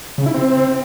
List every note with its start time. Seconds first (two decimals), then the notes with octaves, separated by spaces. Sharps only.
0.18 C#3
0.26 E4
0.34 C4